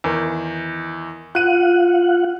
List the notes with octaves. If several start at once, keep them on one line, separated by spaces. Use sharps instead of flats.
E2 D#3
F4 F#5 F#6 D#7